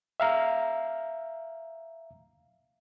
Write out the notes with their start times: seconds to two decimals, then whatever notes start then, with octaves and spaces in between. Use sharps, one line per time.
0.20 E5 F5 A#5